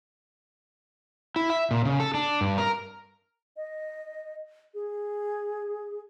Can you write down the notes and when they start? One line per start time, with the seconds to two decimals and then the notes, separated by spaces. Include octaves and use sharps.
1.36 E4
1.50 E5
1.71 A#2
1.85 C#3
2.00 A4
2.14 D4
2.41 G2
2.58 A#4
3.56 D#5
4.74 G#4